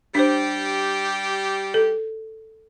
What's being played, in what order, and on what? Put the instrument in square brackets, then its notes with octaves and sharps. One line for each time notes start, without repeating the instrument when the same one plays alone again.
[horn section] G3 G4 [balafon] D4 C5
[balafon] A4